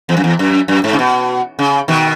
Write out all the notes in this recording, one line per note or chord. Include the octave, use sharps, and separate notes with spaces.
E2
F#2
E2
F#2
F#2
G#2
C#3
B2
C#3
B2 D#3